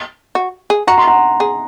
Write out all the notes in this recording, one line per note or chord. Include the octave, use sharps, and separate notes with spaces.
F#4
G#4
F#4 A#5
C6
F#5 A#5
G#4